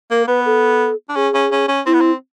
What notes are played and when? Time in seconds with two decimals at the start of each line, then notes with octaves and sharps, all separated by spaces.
0.11 A#3 A#4
0.27 B3 B4
0.46 A4
1.09 D4
1.16 C#4 G#4
1.34 C#4
1.52 C#4
1.68 C#4
1.86 C4 E4
1.93 B3
2.00 C4